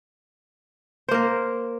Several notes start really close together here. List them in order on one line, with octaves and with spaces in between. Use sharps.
C5 A#3 A#4